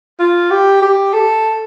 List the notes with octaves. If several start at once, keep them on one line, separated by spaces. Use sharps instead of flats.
F4
G4
G4
A4